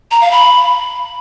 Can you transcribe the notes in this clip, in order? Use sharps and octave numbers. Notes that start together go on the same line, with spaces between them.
A#5
F5
B5